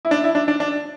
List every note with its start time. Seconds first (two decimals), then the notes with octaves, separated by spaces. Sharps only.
0.05 E4
0.11 D4
0.24 E4
0.35 D4
0.48 D4
0.60 D4